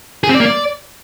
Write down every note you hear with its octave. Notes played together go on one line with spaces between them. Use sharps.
G#4
C4
D5
A#3
D5